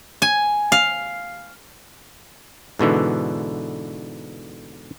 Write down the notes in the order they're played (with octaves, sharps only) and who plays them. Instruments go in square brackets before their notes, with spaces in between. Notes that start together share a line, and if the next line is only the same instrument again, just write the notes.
[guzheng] G#5
F5
[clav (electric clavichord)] G#2 B2 D3 E3